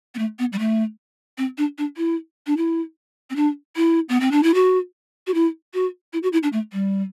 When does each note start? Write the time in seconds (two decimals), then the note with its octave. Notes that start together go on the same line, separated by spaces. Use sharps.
0.15 B3
0.19 A3
0.39 B3
0.53 G3
0.59 A3
1.38 C4
1.58 D4
1.78 D4
1.97 E4
2.47 D4
2.57 E4
3.30 C4
3.36 D4
3.76 E4
4.09 B3
4.20 C4
4.32 D4
4.43 E4
4.54 F#4
5.27 F#4
5.34 E4
5.74 F#4
6.13 E4
6.23 F#4
6.33 E4
6.43 D4
6.53 A3
6.73 G3